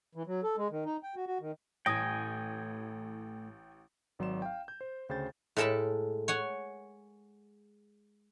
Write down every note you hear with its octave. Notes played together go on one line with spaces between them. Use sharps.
E3
F#3
A4
G#3
D#3
D#4
G5
F#4
F#4
D#3
A1 A2 E3 G5 G#5 D#6 A#6 D7
G#1 F#3 D5 C6 E7
F5 G5
G6
C5
D2 C#3 C5 G5 G6 A6
A2 G#3 A4 A#4 A5 B5
C#5 F#5 G#5